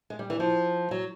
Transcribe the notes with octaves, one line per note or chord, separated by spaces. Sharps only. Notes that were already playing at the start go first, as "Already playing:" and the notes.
G#3
G3
E3
F3
F#3